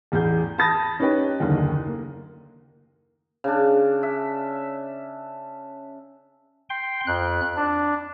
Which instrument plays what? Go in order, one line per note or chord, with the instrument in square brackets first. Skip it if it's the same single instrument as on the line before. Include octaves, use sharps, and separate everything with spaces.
[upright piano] A1 E2 G#4 G6
A5 B5 D#6 A6 A#6
C#4 D#4 G4 B4 C#5 G5
F#1 D#2 D3
A#3
[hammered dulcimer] C#3 D4
E5
[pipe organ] G5 C6
F2 F#6
D4